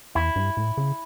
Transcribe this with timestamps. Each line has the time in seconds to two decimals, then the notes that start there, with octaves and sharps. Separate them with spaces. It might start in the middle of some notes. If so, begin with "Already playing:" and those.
0.15 E2 E4
0.36 G2
0.57 A2
0.77 C#3